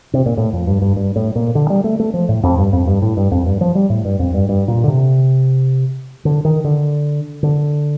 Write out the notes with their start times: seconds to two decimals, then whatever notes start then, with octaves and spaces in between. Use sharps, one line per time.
0.13 C3
0.26 A#2
0.37 A2
0.53 F2
0.67 G2
0.82 G2
0.96 G2
1.16 A2
1.35 A#2
1.55 D3
1.70 G3
1.84 A3
2.00 A3
2.14 F3
2.29 A2
2.43 F2
2.58 G2
2.73 F2
2.87 G2
3.02 A2
3.17 G2
3.31 F2
3.46 G2
3.61 F3
3.75 G3
3.90 A2
4.05 G2
4.19 F2
4.34 G2
4.49 G2
4.68 A#2
4.84 D3
4.88 C3
6.25 D3
6.45 D#3
6.64 D3
7.43 D3